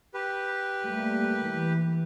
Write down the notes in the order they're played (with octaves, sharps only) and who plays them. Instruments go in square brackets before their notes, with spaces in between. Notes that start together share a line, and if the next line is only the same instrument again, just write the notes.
[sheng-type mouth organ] G4 B4
[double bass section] G3 A3 A#3
E3